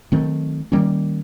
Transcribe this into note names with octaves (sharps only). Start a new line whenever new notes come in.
D#3 F#3 A3 C4
D#3 G3 A#3 C#4